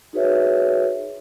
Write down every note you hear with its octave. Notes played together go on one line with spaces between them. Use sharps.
D#4 F#4 G#4 B4 C#5 E5